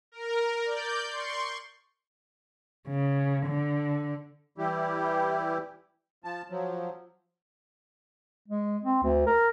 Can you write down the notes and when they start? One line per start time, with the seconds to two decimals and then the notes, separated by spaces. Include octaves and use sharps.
0.12 A#4
0.65 D5 G6
1.11 C6 C#6
2.88 C#3
3.46 D3
4.58 E3 G3 E4 G4
6.24 F3 A5
6.50 F3 F#3
8.48 G#3
8.83 C4
9.03 D2
9.27 A#4